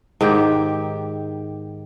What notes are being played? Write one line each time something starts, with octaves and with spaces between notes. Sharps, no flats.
G#2 D#3 G4